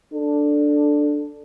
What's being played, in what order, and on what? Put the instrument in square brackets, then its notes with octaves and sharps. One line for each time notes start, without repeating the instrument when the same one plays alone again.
[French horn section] D4 A4